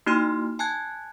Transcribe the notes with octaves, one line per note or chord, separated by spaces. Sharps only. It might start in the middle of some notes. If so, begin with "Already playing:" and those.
A#3 D#4 E4 F#4 C6 F6
G#5 A5 F#6 G#6